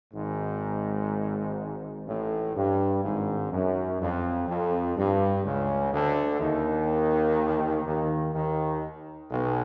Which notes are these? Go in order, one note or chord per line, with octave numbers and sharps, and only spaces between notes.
G#1 G#2
A1 A2
G2
G#1 G#2
F#2
F2
F2
G2
C#2 C#3
D2 D3
D#2 D#3
D#2 D#3
D#2 D#3
B1 B2